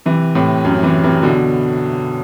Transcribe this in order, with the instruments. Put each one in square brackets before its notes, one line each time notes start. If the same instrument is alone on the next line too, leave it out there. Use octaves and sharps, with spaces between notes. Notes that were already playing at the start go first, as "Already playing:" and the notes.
[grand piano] C3 E3
A2 C3
F#2
C3 E3
C3 E3
B2 D3